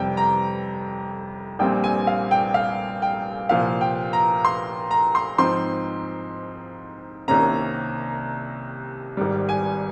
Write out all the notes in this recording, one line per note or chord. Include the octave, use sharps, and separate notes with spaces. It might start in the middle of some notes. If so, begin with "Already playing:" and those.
Already playing: F2 C3 G3 G5
A#5
A#1 A#2 G3 C4 G5
G#5
F5
G5
F5
G5
C2 A#2 F3 F5
G5
A#5
C6
A#5
C6
G#2 F3 C4 D#4 C6
C2 C3 D#3 A#3 C#4 A#5
G#1 G#2 G3
G#5